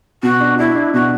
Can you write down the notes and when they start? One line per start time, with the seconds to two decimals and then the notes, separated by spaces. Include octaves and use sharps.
0.23 B2 F#4
0.40 D4
0.59 D4 E4
0.75 D4
0.94 B2 F#4